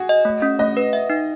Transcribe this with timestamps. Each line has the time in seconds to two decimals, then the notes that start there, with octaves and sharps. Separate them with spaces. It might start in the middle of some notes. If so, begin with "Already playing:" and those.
Already playing: F#4 G#4
0.09 D#5
0.25 A3
0.42 C#4
0.59 A3 D#5
0.77 B4
0.93 E5
1.10 D#4